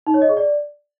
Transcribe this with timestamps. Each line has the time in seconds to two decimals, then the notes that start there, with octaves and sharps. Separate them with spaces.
0.07 D#4
0.14 C#5
0.22 D#5
0.29 G#4
0.37 D5